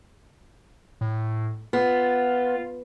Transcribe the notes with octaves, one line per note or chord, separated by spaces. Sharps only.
A2
B3 F4